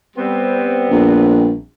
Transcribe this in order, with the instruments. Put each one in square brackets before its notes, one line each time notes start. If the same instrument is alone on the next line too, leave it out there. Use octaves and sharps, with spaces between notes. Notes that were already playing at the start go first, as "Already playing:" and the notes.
[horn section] G3 B3 C4
[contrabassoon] A#1